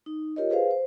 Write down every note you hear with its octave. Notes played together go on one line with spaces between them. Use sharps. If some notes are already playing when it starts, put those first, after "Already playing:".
D#4
F4 G4 A#4 C#5 D#5
G#4 B4 C5 F5
C5